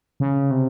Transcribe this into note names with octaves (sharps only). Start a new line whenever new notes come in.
C#3
C3